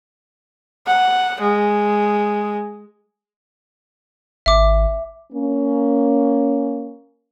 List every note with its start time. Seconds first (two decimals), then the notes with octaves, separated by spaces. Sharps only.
0.86 F#5
1.41 G#3
4.46 G#1 E5 D6
5.32 A#3 C#4